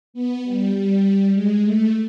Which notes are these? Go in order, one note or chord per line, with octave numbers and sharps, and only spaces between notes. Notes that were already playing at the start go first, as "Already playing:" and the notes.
B3
G3
G3
G#3
A3